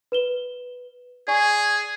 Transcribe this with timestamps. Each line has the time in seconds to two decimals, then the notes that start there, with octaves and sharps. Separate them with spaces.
0.12 B4 E7 G7
1.28 G#4 D5 G#5 C#6